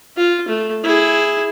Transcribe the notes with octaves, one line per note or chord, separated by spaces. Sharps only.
F4
A3
E4 G#4